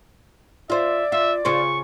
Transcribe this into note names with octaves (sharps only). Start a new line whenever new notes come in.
F4 C5 D5 E5
F4 E5
C#3 F4 C5 C#6